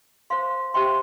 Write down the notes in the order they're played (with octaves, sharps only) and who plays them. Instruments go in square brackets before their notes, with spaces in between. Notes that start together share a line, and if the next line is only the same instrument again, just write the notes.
[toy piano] C5 F5 C6
G4 C5 E5 G5 C6